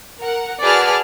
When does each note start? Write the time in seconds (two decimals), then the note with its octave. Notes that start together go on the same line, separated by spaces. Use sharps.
0.20 A#4 F#5
0.61 F#4 G#4 B4 D5 A5 F6